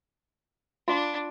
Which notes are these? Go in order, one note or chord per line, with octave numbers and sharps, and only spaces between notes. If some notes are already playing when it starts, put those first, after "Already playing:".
D4 F4 F5 C6